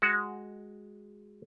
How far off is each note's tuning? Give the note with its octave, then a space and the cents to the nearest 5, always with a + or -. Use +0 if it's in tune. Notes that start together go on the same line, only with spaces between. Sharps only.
G#3 +0 F#4 +0